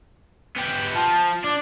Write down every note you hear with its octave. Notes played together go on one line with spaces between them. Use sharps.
B3 G4
F3 A5
D4 D6